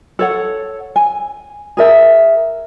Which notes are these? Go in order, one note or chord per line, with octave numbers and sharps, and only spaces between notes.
A4 C#5 F#5
G#5
G#4 A#4 E5